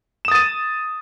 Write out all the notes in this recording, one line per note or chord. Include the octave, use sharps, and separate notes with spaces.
D#6 A6 D#7 E7